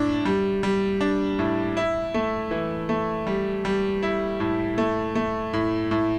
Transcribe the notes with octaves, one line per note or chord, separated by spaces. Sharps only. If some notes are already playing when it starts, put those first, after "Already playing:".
Already playing: A2 D4
G3
G3
D4
A2
E4
A3
E3
A3
G3
G3
E4
A2
A3
A3
A2
A2